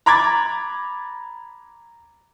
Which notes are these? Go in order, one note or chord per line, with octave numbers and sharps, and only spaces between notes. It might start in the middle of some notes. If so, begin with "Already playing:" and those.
A#5 B5 D6 G#6 A6